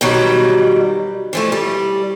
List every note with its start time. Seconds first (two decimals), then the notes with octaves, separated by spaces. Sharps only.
0.01 G#2 B2 D#3 F#3 G3
1.33 E3 F3 A3
1.52 G3